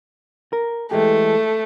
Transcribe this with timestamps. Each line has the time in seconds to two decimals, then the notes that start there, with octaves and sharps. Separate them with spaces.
0.53 A#4
0.91 E3 G#3 A3 G4